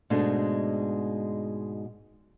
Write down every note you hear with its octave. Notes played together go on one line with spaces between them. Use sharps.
G#2 B2 G#3 A3 D4